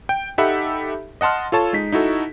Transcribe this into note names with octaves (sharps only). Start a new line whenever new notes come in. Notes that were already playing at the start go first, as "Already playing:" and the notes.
G5
D#4 G4 A4 E5 F#5 B5
D#5 F#5 A5 C6 F6
F4 A4 C#5 A5
G#3 D#4 B6
D#4 E4 F#4 A4